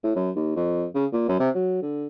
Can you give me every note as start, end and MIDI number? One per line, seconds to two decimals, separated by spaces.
0.04 0.13 45
0.16 0.30 42
0.35 0.53 39
0.56 0.85 41
0.95 1.06 49
1.13 1.25 46
1.28 1.36 42
1.40 1.50 48
1.55 1.78 54
1.82 2.07 50